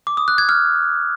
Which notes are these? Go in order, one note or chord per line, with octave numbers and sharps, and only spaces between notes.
D6
D#6
F#6
G#6
F6